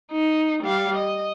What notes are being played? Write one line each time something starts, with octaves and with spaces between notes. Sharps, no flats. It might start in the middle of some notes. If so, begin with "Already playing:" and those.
D#4
G3 F5
D#5